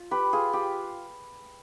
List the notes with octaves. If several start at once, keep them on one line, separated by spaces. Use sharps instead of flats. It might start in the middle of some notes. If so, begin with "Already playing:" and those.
Already playing: F4
G4 B4
F4 G#4
G4